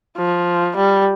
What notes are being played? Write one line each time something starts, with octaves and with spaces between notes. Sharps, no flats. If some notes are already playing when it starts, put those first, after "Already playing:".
F3
G3